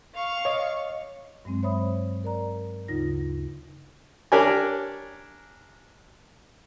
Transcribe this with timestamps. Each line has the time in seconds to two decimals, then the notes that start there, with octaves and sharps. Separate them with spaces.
0.14 F5 C#6
0.45 C#5 D#5
1.45 G2 F#3 G#3 C4
1.63 C5 C#5 E5 B5 D#6
2.24 A#4 D5 A#5
2.88 D2 C#3 D#4 F4 A#6
4.32 D4 G4 A#4 C#5 D5 G#5